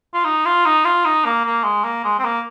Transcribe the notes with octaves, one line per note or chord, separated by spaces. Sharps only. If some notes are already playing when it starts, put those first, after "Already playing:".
F4
D#4
F4
D#4
F4
D#4
A#3
A#3
G#3
A#3
G#3
C4
A#3